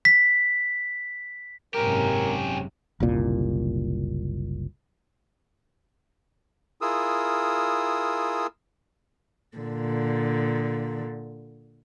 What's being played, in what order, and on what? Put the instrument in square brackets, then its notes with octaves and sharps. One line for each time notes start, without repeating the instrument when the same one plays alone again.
[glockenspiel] B6
[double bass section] F#1 G#2 C3 [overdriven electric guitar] C#4 G4 [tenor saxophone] A#4
[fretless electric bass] F#1 C2 A#2
[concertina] E4 F4 G#4 A#4 D#6 E6
[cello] A#2 D3